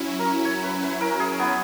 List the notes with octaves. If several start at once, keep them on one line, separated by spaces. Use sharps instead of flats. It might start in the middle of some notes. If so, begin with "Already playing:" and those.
Already playing: F#3 C#4 E4
A#4
C#5
B4
B4
A#4
G#4
B3